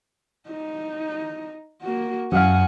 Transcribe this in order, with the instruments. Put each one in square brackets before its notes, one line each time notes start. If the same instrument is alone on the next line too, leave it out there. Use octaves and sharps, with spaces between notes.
[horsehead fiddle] D#4
A#3 F#4
[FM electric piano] F#2 F5 [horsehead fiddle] F#5 G#5